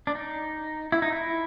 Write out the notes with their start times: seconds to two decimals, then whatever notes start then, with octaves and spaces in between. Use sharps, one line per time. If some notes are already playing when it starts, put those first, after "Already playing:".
0.07 D4
0.15 D#4
0.92 E4
1.02 D#4
1.12 E4